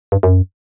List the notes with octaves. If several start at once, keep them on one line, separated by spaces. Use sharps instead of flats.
G2
F#2